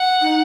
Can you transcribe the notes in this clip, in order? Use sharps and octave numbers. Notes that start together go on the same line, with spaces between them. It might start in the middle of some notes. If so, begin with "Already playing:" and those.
Already playing: F#5
D#4